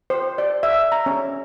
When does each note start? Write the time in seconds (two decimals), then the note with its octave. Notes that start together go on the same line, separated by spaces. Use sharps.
0.10 C5
0.38 D5
0.63 E5
0.92 A#5
1.06 C#4